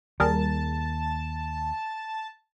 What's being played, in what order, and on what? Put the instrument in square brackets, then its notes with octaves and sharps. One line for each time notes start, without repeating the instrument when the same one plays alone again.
[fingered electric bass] D#2 [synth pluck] G3 G#4 A#4 [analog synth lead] A5